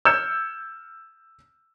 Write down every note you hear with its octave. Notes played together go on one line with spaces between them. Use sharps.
E6 F6 G6 G#6 C#7 E7